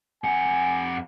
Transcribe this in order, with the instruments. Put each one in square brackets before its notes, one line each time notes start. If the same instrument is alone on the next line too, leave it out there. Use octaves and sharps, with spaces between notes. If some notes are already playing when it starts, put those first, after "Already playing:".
[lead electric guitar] F2 F#5 [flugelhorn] G#5